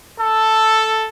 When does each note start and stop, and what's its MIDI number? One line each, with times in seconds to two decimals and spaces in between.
0.18 1.06 69